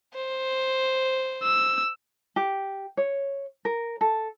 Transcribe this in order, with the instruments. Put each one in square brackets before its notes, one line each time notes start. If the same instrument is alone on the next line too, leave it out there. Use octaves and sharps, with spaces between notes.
[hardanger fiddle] C5
[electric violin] E6
[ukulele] G4
C#5
A#4
A4